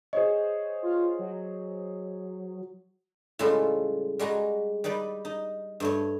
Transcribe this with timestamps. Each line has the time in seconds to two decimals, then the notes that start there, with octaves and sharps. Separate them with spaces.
0.13 G#4 C5 C#5 D#5
0.82 F4
1.19 F#3
3.39 A2 C#3 G3 G#3 F4 A4
4.19 G3 G#3 F#4 A#5
4.84 G3 D#4 B4 D5
5.25 D#4
5.80 G2 A3 C#5